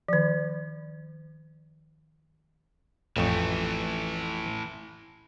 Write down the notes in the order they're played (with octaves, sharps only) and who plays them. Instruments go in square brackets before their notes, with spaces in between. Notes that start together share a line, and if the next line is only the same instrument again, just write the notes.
[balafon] D#3 F3
[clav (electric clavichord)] A1 F2 C#5 [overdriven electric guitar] E3 A3